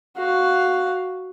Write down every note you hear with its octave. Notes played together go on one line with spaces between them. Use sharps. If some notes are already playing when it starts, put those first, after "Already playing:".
F#4 F5